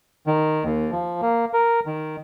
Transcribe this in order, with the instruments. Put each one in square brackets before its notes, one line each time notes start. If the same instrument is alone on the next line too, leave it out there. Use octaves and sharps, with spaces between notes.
[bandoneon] D#3
D#2
F3
A#3
A#4
D#3